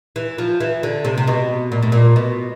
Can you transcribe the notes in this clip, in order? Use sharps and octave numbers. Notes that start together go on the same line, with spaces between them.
E3
F3
E3
D3
C3
C3
B2
A#2
A2
A#2
B2